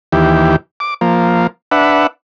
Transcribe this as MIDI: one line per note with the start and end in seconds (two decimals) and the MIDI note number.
0.12 0.56 39
0.12 0.56 52
0.12 0.56 67
0.80 0.94 86
1.01 1.47 53
1.01 1.47 58
1.71 2.07 62
1.71 2.07 71
1.71 2.07 76
1.71 2.07 78